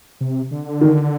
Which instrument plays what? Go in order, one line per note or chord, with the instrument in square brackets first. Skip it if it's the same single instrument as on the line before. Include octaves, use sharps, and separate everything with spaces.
[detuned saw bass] C3
D3
[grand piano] D#3